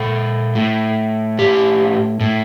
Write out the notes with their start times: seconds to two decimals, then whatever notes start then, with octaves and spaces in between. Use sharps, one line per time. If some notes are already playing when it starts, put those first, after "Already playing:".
Already playing: A#2 A4
0.55 A2
1.39 G4
2.20 A2